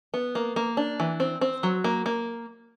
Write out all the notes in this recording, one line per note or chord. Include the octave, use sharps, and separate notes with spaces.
B3
A#3
A#3
D4
E3
C4
C4
F#3
A#3
A#3